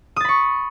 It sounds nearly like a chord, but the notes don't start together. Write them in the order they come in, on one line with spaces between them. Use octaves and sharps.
D#6 A6 B5 C#6